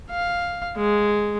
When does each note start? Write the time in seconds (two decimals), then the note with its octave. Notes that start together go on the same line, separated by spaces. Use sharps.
0.10 F5
0.77 G#3